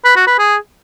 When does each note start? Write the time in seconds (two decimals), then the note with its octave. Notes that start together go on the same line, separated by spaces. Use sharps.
0.05 B4
0.16 F#4
0.27 B4
0.38 G#4